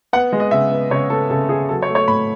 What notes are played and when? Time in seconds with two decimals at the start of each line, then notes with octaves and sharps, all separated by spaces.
0.13 B3 F#5
0.32 G#3
0.40 D#5
0.51 C#3 E5
0.71 B3
0.90 C#3 C#5
1.10 B3 A4
1.30 C#3 A4
1.49 B3 G#4
1.69 F#3 A4
1.82 C#5
1.88 A3
1.95 C#5
2.08 A2 B5